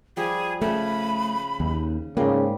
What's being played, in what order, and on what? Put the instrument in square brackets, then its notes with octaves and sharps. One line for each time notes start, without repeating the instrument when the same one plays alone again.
[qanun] F3 G3 [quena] G#4
[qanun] C#3 G#4 [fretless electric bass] A3 [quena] B5
[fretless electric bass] D#2
[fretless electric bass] G#2 A#3 [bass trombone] C#3 [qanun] G3 F4